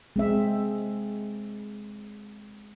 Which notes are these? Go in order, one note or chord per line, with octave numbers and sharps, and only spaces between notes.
G#3 C4 E5